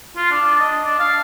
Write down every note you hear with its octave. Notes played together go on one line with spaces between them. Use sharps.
F4
D4
D#5
D4
F5